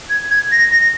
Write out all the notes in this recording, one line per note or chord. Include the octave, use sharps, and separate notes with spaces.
G#6
G#6
A#6